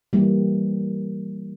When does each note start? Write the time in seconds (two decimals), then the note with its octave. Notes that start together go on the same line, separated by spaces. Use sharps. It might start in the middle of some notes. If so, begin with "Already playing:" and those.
0.13 E3 G3 A#3